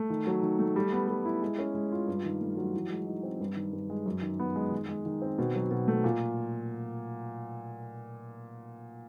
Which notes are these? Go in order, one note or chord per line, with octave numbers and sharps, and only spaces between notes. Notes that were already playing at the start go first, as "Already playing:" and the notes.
Already playing: A3
D#3
F#3
D#3
A3
G3
B3
G3
E4
G#3
C#4
G#3
F4
G2
D#3
A3
F#3
E3
G#3
D#4
C4
G2
D#3
G2
G#3
F#2
D#3
B3
G#3
D#3
G#3
D#3
C4
B2
F#3
B2
A3
A#2